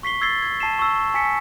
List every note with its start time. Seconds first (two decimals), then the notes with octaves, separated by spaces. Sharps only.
0.03 C#6 B6 C7 G7
0.21 E6 G#6 A6 C7 G7
0.42 G#6
0.60 A5 C7 E7
0.79 C#6 E6
1.14 G#5 B6 C#7